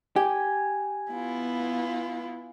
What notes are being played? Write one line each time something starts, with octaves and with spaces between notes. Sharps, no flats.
G4 G#5
B3 E4 F4